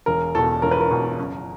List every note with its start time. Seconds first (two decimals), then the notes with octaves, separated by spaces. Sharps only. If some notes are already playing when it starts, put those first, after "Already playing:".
0.06 E1 A#4
0.35 E2 B2 A4
0.62 E1 A#4
0.71 B4
0.80 A#4
0.91 E2 B2
1.18 F#1